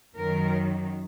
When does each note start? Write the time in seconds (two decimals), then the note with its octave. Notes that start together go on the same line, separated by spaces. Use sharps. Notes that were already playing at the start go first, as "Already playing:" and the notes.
0.16 F#2 D#3 F#3 A#4